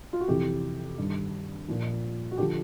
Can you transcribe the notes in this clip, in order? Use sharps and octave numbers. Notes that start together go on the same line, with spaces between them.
F4
F#4
F2 C3 E3 G4
G2 D#3
A#2 F3
F#4
D3 F3 G4